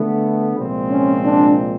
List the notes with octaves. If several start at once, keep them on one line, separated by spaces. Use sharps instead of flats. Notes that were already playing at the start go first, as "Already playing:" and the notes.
Already playing: D3 G3 A3 B3
C2 A#2 F3 G#3 C4
C#4
D4